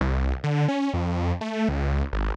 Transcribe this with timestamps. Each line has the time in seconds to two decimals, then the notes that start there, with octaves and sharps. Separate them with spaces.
0.01 C2
0.44 D3
0.68 C#4
0.94 F2
1.41 A3
1.69 C#2
2.13 G#1